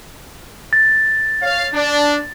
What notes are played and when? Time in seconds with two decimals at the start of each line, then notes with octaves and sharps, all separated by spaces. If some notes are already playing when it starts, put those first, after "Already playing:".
0.73 A6
1.43 C#5 F5
1.74 D4